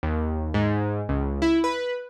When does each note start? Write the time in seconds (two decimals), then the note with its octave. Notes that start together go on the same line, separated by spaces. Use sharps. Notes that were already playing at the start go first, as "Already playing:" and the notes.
0.03 D#2
0.54 G#2
1.09 C#2
1.42 E4
1.64 B4